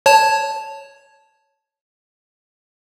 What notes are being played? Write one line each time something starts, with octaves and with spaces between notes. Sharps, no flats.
C#5 A5